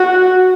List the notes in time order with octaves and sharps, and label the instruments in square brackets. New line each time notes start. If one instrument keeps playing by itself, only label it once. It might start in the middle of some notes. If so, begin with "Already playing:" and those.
Already playing: [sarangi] F#4